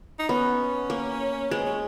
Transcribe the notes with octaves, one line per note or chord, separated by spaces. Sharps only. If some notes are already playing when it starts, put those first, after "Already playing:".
D#4
B3 C#4
A#3
G#3 B3
C#4